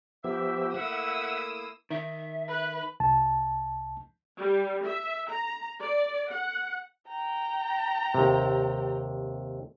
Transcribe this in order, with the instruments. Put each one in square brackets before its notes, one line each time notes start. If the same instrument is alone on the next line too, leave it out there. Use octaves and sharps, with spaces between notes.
[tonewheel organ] F3 B3 G4 [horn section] E5
[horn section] A3 A#3 E4 [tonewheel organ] E5 F#5 [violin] D#6 E6
[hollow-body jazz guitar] D#3 [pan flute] E5
[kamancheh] B4 F#6
[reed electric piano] C2 A5
[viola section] G3
E5
A#5
D5
F#5
[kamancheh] G5 A#5
[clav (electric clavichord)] D#2 C3